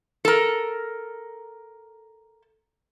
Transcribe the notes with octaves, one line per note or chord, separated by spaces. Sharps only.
A4 A#4